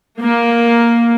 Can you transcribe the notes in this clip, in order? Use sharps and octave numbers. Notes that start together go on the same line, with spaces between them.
A#3